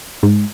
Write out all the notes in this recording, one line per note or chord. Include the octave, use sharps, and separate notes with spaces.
G#2